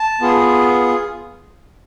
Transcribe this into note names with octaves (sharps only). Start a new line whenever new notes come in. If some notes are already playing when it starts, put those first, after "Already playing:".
Already playing: A5
B3 F4 G#4